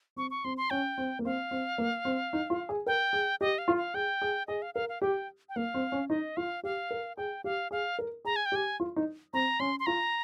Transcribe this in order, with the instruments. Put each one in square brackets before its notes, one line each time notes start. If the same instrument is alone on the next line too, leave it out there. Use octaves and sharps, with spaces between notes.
[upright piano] C4 [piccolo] C#6
[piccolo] C#6
[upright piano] C4 [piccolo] C6
[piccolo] C6
[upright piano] C#4 [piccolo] G5
[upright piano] C4
A#3
[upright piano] C4 [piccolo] F5
[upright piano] C4
A#3
C4
D#4
F4
G#4
[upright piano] A#4 [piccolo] G5
[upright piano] G#4
[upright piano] G4 [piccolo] D#5
[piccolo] F5
[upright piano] F4
[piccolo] F5
[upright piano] G#4 [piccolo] G5
[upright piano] G#4
[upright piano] G#4 [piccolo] D#5
[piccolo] F5
[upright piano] A#4 [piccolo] F5
[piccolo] F5
[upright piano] G4 [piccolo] G5
[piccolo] G5
[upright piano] A#3 [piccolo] F5
[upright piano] C4
C#4
[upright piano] D#4 [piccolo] D#5
[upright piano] F4 [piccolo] F5
[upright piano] G4 [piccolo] F5
[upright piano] A#4
[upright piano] G#4 [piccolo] G5
[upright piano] G4 [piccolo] F5
[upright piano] G#4 [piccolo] F5
[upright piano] A#4
[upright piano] G#4 [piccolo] A#5
[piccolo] G#5
G5
[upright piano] G4
[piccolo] G#5
[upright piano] F4
D#4
[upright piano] C4 [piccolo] A#5
[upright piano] C#4 [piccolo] C6
[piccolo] C6
[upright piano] F4 [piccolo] A#5